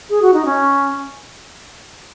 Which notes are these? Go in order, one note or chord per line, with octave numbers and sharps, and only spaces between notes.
G#4
F#4
D#4
C#4